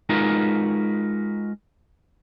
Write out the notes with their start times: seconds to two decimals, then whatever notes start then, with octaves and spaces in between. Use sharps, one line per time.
0.09 G#3 D#4 F4 F#4 A#4 B4